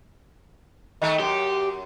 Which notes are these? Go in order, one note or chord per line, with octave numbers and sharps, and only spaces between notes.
D#3 A3
F#2 G4